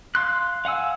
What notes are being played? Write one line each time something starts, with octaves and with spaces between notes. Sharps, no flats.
F5 C6 F#6
F5 F#5 G#5 E6